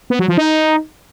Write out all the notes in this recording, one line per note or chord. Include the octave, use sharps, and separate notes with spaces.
B3
F#3
F3
D#4